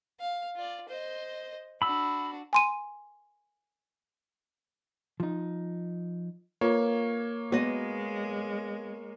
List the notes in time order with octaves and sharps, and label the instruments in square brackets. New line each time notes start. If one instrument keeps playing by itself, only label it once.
[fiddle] F5
F4 D5
C5 D#5
[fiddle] D4 F#4 [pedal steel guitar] B5 E6
[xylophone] G#5 C6 D#7
[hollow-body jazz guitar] F3 D#4
[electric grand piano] A#3 C#5 [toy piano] F4 B4
[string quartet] G#3 [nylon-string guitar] B3 D#5 [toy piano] F#4 B4